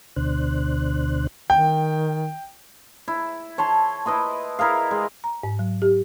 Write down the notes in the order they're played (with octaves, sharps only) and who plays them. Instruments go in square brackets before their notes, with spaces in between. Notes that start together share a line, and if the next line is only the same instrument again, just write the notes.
[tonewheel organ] D2 B2 D3 D4 C5 F#6
[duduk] D#3 [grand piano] G5
[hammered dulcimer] E4
C#5 A5 C6
E4 B4 D#5 C6
E4 A#4 D#5 F5
G#3
[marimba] A#5
G#2
F#3
G4